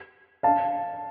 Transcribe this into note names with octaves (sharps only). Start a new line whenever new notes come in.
F5 A5